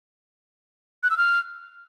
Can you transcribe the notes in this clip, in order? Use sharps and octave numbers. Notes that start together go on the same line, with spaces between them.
F#6
E6
F6